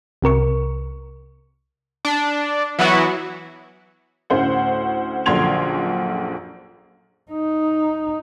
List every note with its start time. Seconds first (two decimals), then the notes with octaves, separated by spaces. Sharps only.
0.22 C2 C3 A#4 C#6
2.05 D4
2.79 E3 F#3 B3 E4 F#4
4.30 D2 A2 C#4 C5 F#5
5.26 A#1 F#2 D3 C6 G#6 F7
7.32 D#4